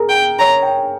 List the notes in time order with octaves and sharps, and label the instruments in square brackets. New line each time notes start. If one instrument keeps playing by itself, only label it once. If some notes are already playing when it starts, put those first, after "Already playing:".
Already playing: [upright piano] G#4 A#4
[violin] G5
[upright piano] C#5 [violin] A#5
[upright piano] G5